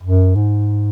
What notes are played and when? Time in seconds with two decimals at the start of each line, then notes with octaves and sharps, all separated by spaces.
0.03 F#2
0.35 G#2